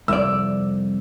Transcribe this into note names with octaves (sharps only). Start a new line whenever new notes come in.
C2 F2 D5 E6